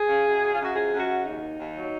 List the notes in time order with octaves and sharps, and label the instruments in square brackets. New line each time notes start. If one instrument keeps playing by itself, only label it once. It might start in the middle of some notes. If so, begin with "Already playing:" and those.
Already playing: [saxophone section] G#4
C#3
F#2
C#3
F4
F#2
F#4
F3 G#4
F#2
F#4
C#3
D#2 D#4
D#3
D#2
F#3